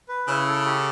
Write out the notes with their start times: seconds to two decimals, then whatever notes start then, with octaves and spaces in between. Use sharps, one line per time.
0.09 B4
0.28 C#3 E4
0.47 A4
0.65 G4